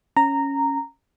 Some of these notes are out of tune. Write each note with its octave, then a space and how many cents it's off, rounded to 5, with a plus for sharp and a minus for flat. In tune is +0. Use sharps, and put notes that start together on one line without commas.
C#4 +0 A#5 -10